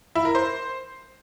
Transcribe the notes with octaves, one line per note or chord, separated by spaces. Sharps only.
E4
A#4
C5